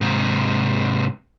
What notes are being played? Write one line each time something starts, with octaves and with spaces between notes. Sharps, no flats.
G#2 C3